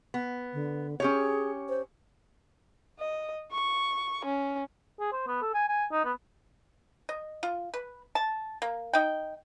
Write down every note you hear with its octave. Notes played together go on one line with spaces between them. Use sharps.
B3
D3
C#4 G4 G#4 C#5
C5
D#5
C#6
C#4
G#4
C5
B3
A4
G#5
G#5
D#4
B3
D#5
F4
B4
A5
A#3
D#4 G5